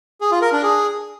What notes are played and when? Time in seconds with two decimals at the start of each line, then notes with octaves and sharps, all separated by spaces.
0.21 G#4
0.31 F4
0.42 A#4
0.52 D4
0.63 G#4